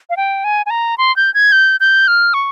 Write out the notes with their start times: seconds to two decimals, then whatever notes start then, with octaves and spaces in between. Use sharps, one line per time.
0.10 F5
0.17 G5
0.44 G#5
0.66 G#5
0.70 A#5
0.98 C6
1.16 G6
1.34 G#6
1.52 G6
1.80 G6
2.08 F6
2.34 C#6